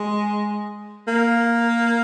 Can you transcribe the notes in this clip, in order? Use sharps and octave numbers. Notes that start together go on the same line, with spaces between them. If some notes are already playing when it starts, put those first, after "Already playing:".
Already playing: G#3
A#3